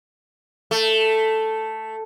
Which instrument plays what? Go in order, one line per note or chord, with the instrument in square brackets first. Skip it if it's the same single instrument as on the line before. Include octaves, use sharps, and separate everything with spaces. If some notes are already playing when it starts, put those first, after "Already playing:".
[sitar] A3